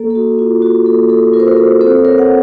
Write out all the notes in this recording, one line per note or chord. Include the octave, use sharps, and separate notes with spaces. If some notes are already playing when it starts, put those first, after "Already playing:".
Already playing: A#3 A4
A4
F#4
F4
F#4
A#3 A4
A4
F4 A#4
C5
F#4 A#4
A4 C5
C4 A4 C5
A#4 C#5
F#5